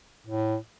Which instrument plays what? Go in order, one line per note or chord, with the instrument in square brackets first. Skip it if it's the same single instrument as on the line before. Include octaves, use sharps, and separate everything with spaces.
[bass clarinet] A2